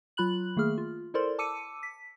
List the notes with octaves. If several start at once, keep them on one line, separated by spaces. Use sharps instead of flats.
F#3 F4 B5 F#6 F#7
D#3 A3 A#3 G#4 F6
F4
E4 A4 A#4 C5 D5 C6
A5 D6 E6 C#7 D#7
B6